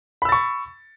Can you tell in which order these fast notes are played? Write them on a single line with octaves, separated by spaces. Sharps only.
B5 E6 A6 C#6